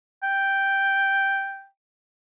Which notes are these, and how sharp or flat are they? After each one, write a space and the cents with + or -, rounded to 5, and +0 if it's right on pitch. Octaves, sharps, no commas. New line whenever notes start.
G5 +0